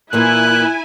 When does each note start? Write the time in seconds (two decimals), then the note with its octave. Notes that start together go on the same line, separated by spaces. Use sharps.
0.13 A#2 E3 A#3 E4 G#5 F#6